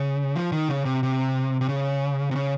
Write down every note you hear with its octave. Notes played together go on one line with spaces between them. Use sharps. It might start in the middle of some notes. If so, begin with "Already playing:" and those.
Already playing: C#3
F3
D#3
C#3
C3
C3
C3
C#3
C3
C#3